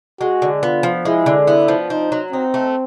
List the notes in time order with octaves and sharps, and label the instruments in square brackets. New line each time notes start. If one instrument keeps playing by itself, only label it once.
[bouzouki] G#3 [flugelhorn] F#4
[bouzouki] D3
[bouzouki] B3 [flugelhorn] F4
[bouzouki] F3
[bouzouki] G#3 [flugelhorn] E4
[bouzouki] D3
[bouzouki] B3 [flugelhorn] E4
[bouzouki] F3
[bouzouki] C4 [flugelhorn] D#4
[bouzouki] F#3
[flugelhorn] C4 [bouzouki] D#4
[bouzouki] A3